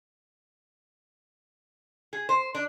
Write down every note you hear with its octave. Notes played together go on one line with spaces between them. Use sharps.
G#4
C5
D4